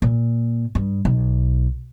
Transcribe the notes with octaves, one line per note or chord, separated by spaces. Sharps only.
A#2
G2
B1